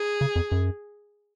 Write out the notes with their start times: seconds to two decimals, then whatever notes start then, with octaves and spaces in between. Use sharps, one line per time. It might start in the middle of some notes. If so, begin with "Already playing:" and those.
Already playing: G#4
0.21 C#3
0.36 F2
0.52 F#2